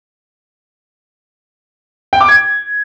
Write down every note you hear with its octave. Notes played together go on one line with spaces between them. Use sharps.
G5
D6
G#6